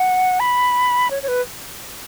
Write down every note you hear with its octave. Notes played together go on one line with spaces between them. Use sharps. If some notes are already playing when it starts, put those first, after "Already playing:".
Already playing: F#5
B5
C#5
C#5
B4